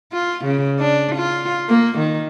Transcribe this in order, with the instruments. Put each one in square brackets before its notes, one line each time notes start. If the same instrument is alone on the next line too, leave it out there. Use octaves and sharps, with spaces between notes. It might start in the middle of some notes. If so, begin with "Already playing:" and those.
[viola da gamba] F4
C#3
D4
F4
A#3
D#3